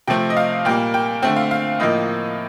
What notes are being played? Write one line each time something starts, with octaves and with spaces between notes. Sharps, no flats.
C3 F3 A3 C4 G5
D#5
F5
A#2 G3 A#3 G5
G5
D3 A3 C4 G5
F5
F5
A2 F3 A#3 D#5